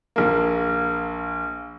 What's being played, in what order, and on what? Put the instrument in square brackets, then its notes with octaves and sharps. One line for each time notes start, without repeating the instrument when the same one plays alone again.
[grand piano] A#1 A#3